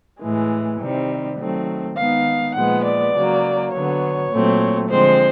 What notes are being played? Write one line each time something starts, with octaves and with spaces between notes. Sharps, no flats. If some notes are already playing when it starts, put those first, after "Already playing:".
A2 E3 G#3
C3 D#3 G3 C4
D#3 F#3 A3 C4
D#3 G#3 B3 F5
A#2 F3 G#3 B3 F#5
D5
C#3 F#3 A#3
D3 F#3 B3 C#5
A#2 F#3 A3 C4
D3 F3 G#3 C4 C5